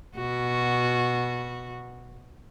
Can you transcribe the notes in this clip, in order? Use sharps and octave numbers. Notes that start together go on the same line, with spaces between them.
B2 F#4